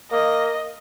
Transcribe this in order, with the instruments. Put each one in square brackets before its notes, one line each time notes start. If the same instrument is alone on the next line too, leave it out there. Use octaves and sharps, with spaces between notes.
[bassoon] A#3 [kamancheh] D#5